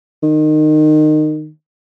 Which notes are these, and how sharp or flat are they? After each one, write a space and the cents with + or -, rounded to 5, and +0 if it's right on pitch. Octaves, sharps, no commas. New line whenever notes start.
D#3 -20